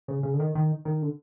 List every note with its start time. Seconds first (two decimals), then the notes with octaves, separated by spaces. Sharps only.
0.08 C#3
0.23 C#3
0.34 D3
0.40 D#3
0.55 D#3
0.85 D#3
1.02 D3